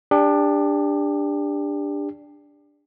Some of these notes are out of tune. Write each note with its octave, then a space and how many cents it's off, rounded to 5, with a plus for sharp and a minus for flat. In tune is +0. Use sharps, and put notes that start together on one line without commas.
D4 +0 G4 +30